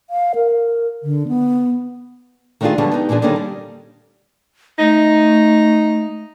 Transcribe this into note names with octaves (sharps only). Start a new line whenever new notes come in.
F5
A#4
D3
B3
D#3 A3 D4 D#4 F4 G#4
D3 F3 G3 G#3 B3 C#4
B3 D#4 G4
A#2 E3 F3 D4 G#4
D3 D#3 G3 A#3 C#4 D#4
G3
A3 D#4